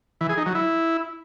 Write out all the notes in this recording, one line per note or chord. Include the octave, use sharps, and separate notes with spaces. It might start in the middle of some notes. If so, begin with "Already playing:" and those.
E3
G#4
D#4
F#3
E4